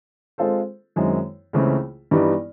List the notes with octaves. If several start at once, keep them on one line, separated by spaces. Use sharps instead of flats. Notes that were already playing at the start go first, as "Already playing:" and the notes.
G#3 C4 F4 A4 C5
F#2 D#3 G#3 C4 E4
C#2 C#3 E3 A3 C4
G2 E3 G3 B3 D#4